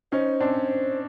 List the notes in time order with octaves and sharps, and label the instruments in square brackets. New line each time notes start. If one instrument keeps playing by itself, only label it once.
[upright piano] C#4 D#4 [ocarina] C5
[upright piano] C4 D4